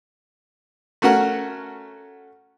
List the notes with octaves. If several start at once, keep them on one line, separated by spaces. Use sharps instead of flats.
A3 C#4 F#4 A#4 F#5